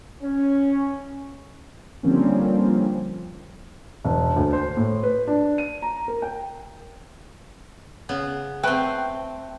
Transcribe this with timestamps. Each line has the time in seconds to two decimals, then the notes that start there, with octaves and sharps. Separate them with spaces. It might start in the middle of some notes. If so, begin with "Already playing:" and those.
0.22 C#4
2.03 D3 F3 G3 A#3 C4 C#4
4.05 E1
4.36 D2
4.53 C5
4.77 A2
5.03 B4
5.28 D4
5.58 D#7
5.82 A#5
6.08 A#4
6.22 G5
8.09 C#3 B3
8.63 A3 C4 B4 G5